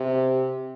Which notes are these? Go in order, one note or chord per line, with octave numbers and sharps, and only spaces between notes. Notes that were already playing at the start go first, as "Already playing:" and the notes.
Already playing: C3